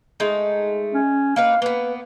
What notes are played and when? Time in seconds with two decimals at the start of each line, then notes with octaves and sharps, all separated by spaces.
0.20 G#3 A3 D#4
0.94 C#4
1.36 A#3 D#4 B4 F5
1.62 A#3 B3 B4